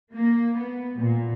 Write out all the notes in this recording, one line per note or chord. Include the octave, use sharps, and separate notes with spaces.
A#3
B3
A#2